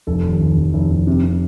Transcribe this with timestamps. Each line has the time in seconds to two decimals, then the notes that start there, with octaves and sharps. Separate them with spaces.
0.07 F1 A4
0.25 D#2
0.41 F1
0.57 F1
0.74 F1
0.91 F1
1.07 C3
1.24 C3